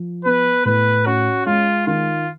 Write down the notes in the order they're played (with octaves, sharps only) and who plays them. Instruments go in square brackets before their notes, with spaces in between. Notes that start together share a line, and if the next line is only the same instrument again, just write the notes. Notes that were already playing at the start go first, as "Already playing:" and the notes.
Already playing: [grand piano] F3
[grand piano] B3 [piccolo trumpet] B4
[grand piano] A2 [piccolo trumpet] B4
[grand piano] C#4 [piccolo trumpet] F#4
[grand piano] G#3 [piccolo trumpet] F4
[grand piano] D#3 [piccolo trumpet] F4